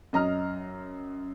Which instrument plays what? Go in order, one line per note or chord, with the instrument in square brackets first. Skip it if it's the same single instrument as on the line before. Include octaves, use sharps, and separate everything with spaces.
[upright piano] F#2 D#5 A#5 F6